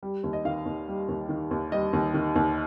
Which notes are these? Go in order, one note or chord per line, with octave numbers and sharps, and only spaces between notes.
G3
D#2
D#5
D#3 F5
D#2
G3
D#2
D#3
D#2
G3 D#5
D#2
D#3
D#2